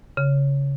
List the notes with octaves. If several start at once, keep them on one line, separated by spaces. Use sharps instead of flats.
C#3